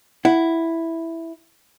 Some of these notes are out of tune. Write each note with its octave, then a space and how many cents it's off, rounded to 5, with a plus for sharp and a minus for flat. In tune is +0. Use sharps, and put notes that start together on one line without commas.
E4 +0 F#5 +0